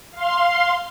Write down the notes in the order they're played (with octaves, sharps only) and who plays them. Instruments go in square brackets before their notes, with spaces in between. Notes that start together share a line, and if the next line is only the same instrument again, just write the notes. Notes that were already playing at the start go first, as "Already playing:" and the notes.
[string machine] F5 C6